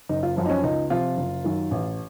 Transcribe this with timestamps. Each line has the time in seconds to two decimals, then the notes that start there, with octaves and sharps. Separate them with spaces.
0.09 F#1 D#4
0.23 F4
0.37 F#2 F3
0.46 D#4
0.50 C#4
0.63 C#2 D#4
0.90 C3 F3 F4
1.17 F#1
1.44 F#2 D#3
1.71 A1